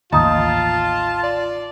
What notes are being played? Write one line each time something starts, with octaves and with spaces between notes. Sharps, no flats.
A1 D#2 D#4 F4 A5
D5